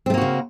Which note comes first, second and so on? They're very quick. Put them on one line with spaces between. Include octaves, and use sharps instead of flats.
C4 A3 A#3 F#4 C#3